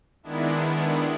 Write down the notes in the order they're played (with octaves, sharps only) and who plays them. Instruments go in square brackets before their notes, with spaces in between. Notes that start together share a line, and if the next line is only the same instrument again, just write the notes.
[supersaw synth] D#3 G#3 B3 D4 E4